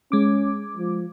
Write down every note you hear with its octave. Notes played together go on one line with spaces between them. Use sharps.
G#3 C#4 D6
F3